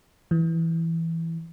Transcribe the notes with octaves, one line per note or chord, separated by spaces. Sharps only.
E3